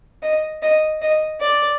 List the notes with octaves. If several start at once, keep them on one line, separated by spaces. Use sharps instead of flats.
D#5
D#5
D#5
D5